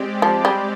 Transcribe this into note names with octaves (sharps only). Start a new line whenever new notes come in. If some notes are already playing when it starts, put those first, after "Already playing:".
Already playing: G#3 C4 G4 D5
F3
G3